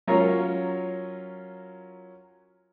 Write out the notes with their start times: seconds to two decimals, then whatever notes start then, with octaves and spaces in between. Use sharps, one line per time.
0.08 F#3 C#4 F4 A#4 C#5 F5